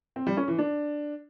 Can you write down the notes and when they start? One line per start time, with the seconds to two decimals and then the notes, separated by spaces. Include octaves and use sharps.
0.16 C4
0.27 G3
0.37 C#4
0.48 E3
0.59 D4